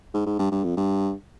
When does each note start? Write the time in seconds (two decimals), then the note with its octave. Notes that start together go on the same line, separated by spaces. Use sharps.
0.14 G#2
0.26 G#2
0.39 G2
0.51 G2
0.64 F2
0.77 G2